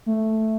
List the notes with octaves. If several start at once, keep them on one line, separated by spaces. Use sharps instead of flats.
A3